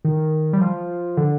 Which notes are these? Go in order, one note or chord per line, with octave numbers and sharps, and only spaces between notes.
D#3
G3
F3
D3